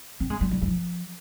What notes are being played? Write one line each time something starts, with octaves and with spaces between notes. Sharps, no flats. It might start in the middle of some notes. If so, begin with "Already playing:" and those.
C4
G#3
G3
G3
G3
F3